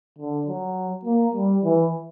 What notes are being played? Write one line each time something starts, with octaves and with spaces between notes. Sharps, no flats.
D3
F#3
A#3
G3
E3